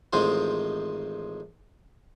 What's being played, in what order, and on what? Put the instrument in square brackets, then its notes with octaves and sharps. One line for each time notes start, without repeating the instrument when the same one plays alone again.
[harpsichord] A1 D#3 G#3 C4 F4 C5